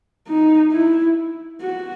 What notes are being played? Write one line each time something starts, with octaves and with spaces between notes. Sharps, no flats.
D#4
E4
F#4